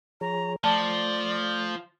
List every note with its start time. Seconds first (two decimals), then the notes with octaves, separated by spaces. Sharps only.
0.21 F3 G#4 C#5 A#5
0.64 F3 A3 D5 A5